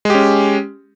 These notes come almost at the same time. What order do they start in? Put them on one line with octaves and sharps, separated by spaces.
G#3 G4 C#4